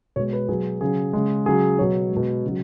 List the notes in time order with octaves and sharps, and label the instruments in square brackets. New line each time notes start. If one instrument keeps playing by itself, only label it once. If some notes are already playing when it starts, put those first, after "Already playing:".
[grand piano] B2 G#3 C#5
B4
B2 F#3 G#4
C#3 F#3 G#4
C#3 G#3
C#3 F#3 G#4
B2 F#3 C#5
G#3
B2
C#3 F#3